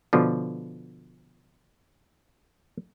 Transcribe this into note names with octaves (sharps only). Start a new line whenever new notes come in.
B2 D3 F3